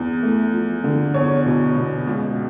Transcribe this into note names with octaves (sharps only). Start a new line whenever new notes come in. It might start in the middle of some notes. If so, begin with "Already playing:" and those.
Already playing: E2
A3
F3
D3
E2 C#5
B2
B2
C#2